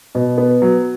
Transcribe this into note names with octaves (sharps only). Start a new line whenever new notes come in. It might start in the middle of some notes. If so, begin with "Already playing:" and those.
B2
B3
F#3